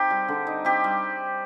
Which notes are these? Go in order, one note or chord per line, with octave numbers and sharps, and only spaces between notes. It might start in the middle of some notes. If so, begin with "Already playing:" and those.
Already playing: C4 D#4 G4
G3
D3
D#4
C4 G4
G3